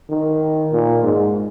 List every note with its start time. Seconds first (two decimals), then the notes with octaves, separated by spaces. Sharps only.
0.10 D#3
0.72 A#2
1.04 G#2